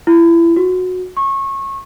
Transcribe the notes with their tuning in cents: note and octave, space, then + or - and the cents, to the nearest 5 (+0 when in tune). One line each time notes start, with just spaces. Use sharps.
E4 +30
F#4 -15
C#6 -25